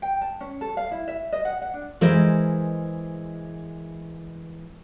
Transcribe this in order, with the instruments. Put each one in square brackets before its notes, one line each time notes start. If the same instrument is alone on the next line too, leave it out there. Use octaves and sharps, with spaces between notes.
[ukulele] G5
A5
C#4
A4
F5
E4
E5
D#5
F#5
F#5
D4
[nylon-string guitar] E3 G#3 A#4 C5 D#5